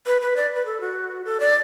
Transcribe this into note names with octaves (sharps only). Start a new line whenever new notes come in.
B4
B4
D5
B4
A4
F#4
A4
D5